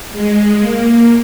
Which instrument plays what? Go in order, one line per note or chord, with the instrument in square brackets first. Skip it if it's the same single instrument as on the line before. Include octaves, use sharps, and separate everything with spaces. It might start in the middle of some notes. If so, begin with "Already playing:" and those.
[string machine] G#3
A#3